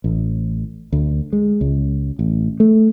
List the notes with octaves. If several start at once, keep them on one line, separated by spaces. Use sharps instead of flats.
A1
D2
G#3
C#2
A1
A3